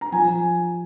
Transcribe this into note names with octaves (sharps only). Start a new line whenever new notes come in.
A#5
F3 G#5